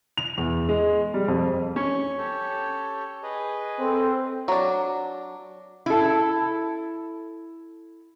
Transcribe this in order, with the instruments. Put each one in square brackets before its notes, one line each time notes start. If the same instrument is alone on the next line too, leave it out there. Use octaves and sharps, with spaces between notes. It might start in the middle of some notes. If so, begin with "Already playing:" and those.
[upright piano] F7
E2
G#3
G3
F2
[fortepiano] C#4 [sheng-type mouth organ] C#6
[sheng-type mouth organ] G4 A4 C#5
G#4 B4 D#5
[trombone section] C4 [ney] A4
[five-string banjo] F#3 D4
[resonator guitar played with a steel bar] E4 A4